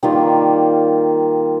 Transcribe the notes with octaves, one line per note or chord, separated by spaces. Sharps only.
D#3 G3 A#3 F4